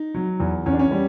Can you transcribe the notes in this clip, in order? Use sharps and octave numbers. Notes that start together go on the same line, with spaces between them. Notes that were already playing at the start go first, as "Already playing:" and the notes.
Already playing: D#4
F#3
E2
E2 C#4
D4
C#4
G3